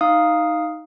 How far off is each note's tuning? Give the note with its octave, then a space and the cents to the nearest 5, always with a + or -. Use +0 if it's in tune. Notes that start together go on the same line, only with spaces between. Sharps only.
D#4 +0 F5 +0 D#6 +0